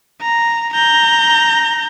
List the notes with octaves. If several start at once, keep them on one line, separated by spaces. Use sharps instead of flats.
A#5
A#5 G6